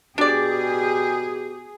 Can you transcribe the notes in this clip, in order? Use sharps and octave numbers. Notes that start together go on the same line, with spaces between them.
B2 D4 G4 G#4 D5